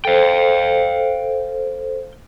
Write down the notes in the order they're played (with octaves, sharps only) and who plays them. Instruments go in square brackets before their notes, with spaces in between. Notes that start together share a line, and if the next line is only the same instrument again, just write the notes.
[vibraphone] A4 C5 [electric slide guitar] F5 G5